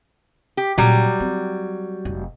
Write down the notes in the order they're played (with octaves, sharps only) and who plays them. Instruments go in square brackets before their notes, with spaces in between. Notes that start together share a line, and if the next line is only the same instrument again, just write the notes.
[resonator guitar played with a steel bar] G4
[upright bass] A#2 C#3 [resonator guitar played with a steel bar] F#3 G3
[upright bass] C4
F1